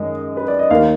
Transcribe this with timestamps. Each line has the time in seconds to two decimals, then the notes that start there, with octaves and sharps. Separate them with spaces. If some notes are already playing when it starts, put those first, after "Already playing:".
Already playing: F#2 D#3 G#3 D#5
0.37 B4
0.48 D5
0.59 D#5
0.70 D#2 D#3 A#3 F5